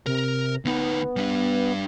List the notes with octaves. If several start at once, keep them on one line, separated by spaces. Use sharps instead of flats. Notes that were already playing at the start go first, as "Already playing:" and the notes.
C3 A#4
D2 B3 D#4
G3 D4